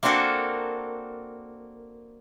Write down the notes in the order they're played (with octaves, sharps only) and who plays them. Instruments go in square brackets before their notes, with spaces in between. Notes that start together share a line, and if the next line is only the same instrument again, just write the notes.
[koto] A#3 C4 D4 F#4 A4 A#4